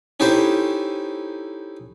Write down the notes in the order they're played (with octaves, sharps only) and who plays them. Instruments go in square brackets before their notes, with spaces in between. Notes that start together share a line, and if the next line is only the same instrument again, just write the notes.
[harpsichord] C#4 D#4 E4 G4 A4 C5